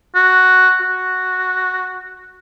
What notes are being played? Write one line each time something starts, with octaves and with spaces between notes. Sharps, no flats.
F#4
F#4